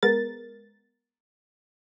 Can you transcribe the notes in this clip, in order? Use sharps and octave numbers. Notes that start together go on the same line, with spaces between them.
G#3 B3 A#4 A6